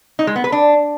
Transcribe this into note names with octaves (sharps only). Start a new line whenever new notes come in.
D#4
G#3
B3
B4
D4